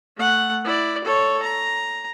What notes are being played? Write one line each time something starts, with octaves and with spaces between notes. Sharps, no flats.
A3 F#5
E4 D5
A4 C#5
A#5